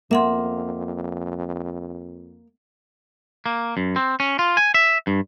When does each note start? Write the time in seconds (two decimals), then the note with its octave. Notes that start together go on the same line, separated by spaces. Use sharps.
0.11 F2 A#3 E5 F#5 C6
3.46 A#3
3.77 F#2
3.96 C4
4.20 C#4
4.39 F4
4.57 G#5
4.74 E5
5.07 G2